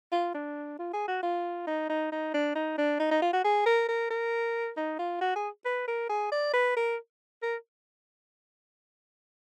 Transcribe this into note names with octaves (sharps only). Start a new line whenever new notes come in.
F4
D4
F4
G#4
F#4
F4
D#4
D#4
D#4
D4
D#4
D4
D#4
D#4
F4
F#4
G#4
A#4
A#4
A#4
D#4
F4
F#4
G#4
B4
A#4
G#4
D5
B4
A#4
A#4